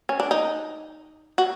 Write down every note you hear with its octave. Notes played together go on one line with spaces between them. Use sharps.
C#4
D4
D#4
F#4